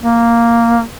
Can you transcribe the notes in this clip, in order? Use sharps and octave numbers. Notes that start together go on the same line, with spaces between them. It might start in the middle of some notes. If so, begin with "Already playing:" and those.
A#3